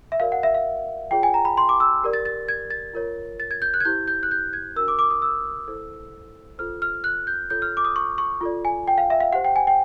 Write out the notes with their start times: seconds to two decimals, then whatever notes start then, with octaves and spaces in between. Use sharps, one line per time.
0.12 E5
0.20 F#4 A#4 D5 F5
0.32 F#5
0.43 E5
0.55 F5
1.11 F4 G#4 C#5 G5
1.23 G#5
1.34 A#5
1.45 B5
1.57 C6
1.69 D6
1.80 E6
2.03 G4 A#4 D5
2.13 A6
2.25 A6
2.48 G#6
2.70 A6
2.93 F4 A#4 C#5
3.40 A6
3.51 G#6
3.62 G6
3.74 F#6
3.80 G#6
3.85 E4 G4 C5 G6
4.08 G6
4.23 F#6
4.31 G6
4.53 G#6
4.76 D4 F#4 A#4 E6
4.88 D6
4.99 D6
5.10 D#6
5.22 E6
5.68 E4 A4 C5
6.58 F4 A4 C5 F6
6.82 F6
7.04 F#6
7.27 G6
7.50 F4 A4 C#5 G6
7.62 F6
7.77 D6
7.85 D#6
7.96 C#6
8.18 C#6
8.41 F4 A4 D5
8.65 G#5
8.88 G5
8.98 F5
9.10 E5
9.21 F5
9.33 G4 C5 F#5
9.45 G5
9.56 G#5
9.67 G5